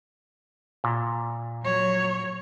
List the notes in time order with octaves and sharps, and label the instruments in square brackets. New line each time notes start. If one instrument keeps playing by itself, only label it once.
[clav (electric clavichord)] A#2
[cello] F#3 C#5